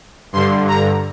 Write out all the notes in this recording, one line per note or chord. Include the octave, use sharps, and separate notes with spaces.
G2 D3 C6
A#5